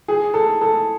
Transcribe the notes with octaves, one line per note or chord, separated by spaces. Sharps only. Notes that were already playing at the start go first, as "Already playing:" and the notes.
G#4
A4
A4